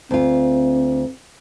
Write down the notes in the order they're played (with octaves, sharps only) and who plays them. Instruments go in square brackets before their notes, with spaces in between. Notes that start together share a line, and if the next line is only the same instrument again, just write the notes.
[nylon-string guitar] D2 F4 [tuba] C4